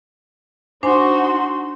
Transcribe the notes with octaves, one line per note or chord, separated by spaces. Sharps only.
D4 D#4 F#4 C5 G#5 C6